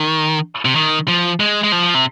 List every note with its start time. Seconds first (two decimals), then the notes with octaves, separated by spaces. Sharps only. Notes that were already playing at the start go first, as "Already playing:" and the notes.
Already playing: D#3
0.65 C3
0.75 D#3
1.08 F3
1.40 G#3
1.64 G#3
1.72 F3
1.94 C3